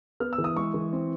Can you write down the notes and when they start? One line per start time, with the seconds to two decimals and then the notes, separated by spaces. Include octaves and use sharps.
0.20 B3 F6
0.33 E6
0.38 E3
0.44 D#6
0.56 G#3 C#6
0.74 E3
0.92 C4